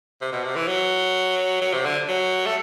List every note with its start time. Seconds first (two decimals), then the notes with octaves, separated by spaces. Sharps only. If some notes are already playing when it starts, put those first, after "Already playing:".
0.21 C3
0.33 B2
0.45 C3
0.56 E3
0.68 F#3
1.61 F#3
1.73 C3
1.85 D3
2.08 F#3
2.46 A3